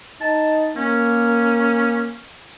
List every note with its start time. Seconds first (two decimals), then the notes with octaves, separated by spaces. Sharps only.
0.21 D#4 A5
0.76 A#3 C#4